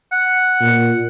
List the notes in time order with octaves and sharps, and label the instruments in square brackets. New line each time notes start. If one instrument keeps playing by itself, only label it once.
[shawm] F#5
[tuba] A#2